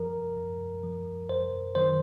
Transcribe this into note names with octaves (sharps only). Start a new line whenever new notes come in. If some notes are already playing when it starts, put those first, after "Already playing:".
Already playing: F#2 F3 A#4
F#2
F3
F#2 C5
D#3 F#3 C5